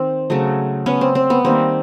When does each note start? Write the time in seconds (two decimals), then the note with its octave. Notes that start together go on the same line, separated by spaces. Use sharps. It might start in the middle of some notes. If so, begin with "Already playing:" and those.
Already playing: D#3 C4
0.30 C#3 F#3 A3
0.86 B3 C#4
1.01 C4
1.15 C4
1.30 B3
1.45 D#3 G3 A#3 C4